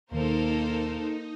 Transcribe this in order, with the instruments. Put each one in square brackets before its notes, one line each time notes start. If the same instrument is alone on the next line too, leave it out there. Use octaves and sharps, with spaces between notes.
[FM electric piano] D#2 B2 D#3 [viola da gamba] A#3 [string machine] D#4 [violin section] A4 A#4 C5